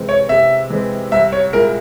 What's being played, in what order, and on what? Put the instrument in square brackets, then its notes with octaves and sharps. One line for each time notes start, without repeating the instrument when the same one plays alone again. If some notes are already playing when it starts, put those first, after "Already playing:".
Already playing: [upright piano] C3 E3 G#3 C4
[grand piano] C#5
[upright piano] C3 [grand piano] E5
[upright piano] E3 G#3 C4
[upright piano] C2 [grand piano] E5
[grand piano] C#5
[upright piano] A#2 G#3 E4 G#4 [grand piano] A#4